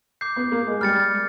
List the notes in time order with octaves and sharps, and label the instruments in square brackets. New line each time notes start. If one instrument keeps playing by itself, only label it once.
[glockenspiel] D6 G6 C7
[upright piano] B3
A#3
G#3
[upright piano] G3 [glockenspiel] F6 A6 C#7